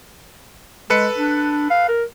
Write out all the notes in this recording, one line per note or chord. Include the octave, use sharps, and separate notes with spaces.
G#3 A4 B4 C#7
D4
F5
A#4